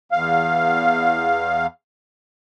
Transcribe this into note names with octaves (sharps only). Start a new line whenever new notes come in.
E2 F5